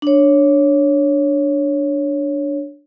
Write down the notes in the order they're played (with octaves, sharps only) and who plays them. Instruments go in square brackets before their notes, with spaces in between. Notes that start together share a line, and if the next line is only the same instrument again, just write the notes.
[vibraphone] D4 C#5